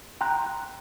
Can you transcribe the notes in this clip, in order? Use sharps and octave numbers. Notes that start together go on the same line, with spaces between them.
G5 A#5 C6 F#6